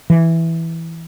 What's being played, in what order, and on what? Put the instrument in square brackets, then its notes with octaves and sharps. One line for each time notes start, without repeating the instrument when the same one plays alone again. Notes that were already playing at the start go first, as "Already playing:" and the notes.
[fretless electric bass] E3